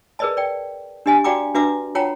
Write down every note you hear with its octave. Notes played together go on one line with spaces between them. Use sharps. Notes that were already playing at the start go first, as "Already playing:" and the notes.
G#4 A#4 B4 D5 D#5 A5
D5 G5
D4 G4 D#5 G#5
F#4 D5 F5 G5 A#5 D6
D4 F#4 B4 E5 A#5 D6
F4 C#5 F#5 G5 A5 A#5